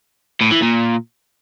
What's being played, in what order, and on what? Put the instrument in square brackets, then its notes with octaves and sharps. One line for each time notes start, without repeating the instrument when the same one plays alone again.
[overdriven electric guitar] A2
E3
A#2